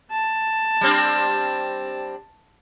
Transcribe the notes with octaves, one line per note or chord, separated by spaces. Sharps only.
A5
G3 C4 D4